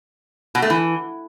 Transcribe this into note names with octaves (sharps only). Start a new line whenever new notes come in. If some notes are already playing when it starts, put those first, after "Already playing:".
B2
A3
E3